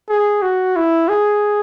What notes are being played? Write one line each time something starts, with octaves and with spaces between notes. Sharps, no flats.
G#4
F#4
E4
G#4